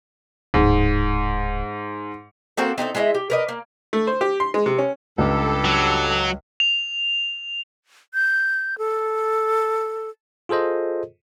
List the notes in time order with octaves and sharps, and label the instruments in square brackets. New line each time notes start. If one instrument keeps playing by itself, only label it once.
[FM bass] D1 [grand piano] G#2
[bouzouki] A#3 C4 F#4 A4
C4 D#4 E4 A4
G#3 E4 D#5 E5
G4
A#4 B4 D#5
A#3
[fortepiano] A3
C5
G4
C6
G#3
C3
C#4
[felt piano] C#2 [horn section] G2 G4 A4
[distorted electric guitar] F#3
[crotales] F7
[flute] G6
A4
[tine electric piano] F4 G#4 A4 C5 D#5